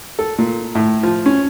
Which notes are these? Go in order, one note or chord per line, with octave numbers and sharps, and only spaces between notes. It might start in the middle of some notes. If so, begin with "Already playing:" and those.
A4
A#2
A2
F3
C#4